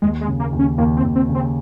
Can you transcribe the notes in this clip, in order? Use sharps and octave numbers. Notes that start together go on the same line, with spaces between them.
D#2 G#3
G#3
C#3
A#3
D#2
C#4
D#2 A#3
C4
D#2
C4
C#3
C4